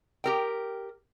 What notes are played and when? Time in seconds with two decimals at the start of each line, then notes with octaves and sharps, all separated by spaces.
0.24 G4 A#4 G5